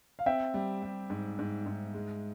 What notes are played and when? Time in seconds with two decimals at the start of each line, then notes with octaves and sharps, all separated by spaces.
0.19 F5
0.26 C4 E5 G5
0.54 G3
0.83 G3
1.10 G#2
1.39 G#2
1.66 G#2
1.94 G#3